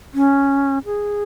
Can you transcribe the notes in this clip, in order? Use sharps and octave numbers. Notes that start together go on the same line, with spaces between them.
C#4
G#4